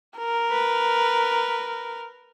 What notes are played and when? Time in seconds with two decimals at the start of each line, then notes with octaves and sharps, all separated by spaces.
0.18 A#4
0.51 B4